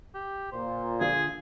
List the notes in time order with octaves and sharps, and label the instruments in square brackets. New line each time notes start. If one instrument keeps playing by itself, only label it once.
[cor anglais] G4
[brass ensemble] A#2 [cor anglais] C5
[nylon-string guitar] D3 F4 F5 [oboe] G#4